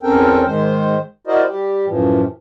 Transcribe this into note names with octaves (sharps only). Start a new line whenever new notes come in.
E2 C4 C#4 A4 A#4 G5
G#2 D#3 G#3 C5
E4 F#4 A#4 C5 D5 D#5
G3 G4
F#2 A2 E3 F3